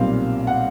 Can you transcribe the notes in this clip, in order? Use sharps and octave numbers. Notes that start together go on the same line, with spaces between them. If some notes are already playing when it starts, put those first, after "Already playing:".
Already playing: B1 A#2 G3 C4 F5
F#5